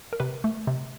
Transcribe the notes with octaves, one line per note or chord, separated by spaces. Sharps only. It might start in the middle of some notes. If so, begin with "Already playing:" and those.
A#4
C3 B4
A3
C3